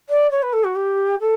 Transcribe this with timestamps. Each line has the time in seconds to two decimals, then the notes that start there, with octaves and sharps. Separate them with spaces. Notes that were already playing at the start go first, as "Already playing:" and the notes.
0.09 D5
0.31 C#5
0.42 B4
0.52 A4
0.64 F#4
0.75 G4
1.20 A4